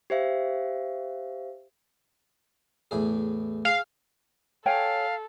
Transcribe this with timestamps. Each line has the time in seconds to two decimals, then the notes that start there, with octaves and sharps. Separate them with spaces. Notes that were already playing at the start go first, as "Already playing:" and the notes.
0.10 G4 C5 E5 F5
2.91 E2 A2 G#4
3.65 G#4 F5
4.66 A4 C#5 F5 G5 G#5